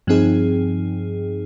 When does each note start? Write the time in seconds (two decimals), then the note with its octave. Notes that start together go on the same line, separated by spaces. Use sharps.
0.07 G2 F3 C4 D#4 G#4